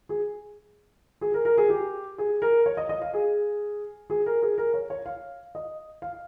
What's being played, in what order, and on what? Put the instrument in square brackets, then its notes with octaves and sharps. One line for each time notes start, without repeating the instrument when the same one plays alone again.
[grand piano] G#4
G#4
A#4
A#4
G#4
G4
G#4
A#4
C#5
D#5
D#5
F5
G#4
G#4
A#4
G#4
A#4
C#5
C#5
F5
D#5
F5